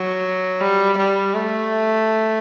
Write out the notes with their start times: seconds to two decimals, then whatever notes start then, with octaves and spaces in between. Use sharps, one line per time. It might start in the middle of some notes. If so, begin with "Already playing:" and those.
Already playing: F#3
0.61 G3
0.97 G3
1.34 A3